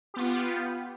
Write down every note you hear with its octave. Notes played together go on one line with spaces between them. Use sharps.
B3 F4 G4